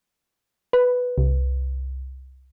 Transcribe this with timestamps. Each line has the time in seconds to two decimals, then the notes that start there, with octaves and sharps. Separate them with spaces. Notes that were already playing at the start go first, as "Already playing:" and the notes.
0.73 B4
1.18 C2